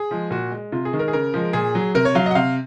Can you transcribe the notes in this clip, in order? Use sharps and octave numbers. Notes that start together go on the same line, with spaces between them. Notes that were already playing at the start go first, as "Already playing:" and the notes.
Already playing: G#4
F3 G#3
A#2 F#4
G#3
C3 F4
G#4
D#3 G#3
A#4
G#4
C#3 A#4
F3 G#3
A#2 G#4
F#3
C3 A#4
C#5
F#3 F5
D#5
F#5
C3 F5